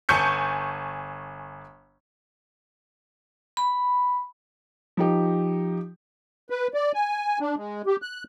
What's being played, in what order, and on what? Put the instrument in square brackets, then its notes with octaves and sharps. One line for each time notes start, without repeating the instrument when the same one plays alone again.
[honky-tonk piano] G1 G#5 A5 C#6 G6 C#7
[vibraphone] B5
[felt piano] F3 D#4 G4
[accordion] B4
D5
G#5
D4
G#3
G4
F#6